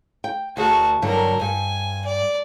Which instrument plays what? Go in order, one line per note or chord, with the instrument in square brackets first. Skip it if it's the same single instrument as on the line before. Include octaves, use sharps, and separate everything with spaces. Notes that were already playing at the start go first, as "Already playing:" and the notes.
[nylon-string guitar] G5
[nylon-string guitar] D2 G#4 A#4 [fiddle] F#4 A5
[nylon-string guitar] G2 D3 F#3 [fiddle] A4 A#4
[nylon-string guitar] G2 [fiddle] G#5
[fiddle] D5